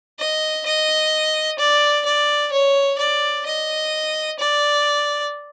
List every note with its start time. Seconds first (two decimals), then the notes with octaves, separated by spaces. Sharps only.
0.19 D#5
0.66 D#5
1.59 D5
2.05 D5
2.52 C#5
2.98 D5
3.46 D#5
4.39 D5